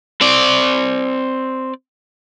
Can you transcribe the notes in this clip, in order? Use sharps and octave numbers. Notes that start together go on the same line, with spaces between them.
C4 D5